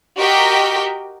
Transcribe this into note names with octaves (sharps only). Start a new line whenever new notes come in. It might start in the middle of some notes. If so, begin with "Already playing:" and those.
F#4 G4 A#4 D#5 G5 B6